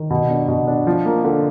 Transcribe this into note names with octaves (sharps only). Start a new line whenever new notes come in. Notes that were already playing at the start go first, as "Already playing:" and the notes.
Already playing: D#3
B2
D4
B2
D4
F3
A#3
D3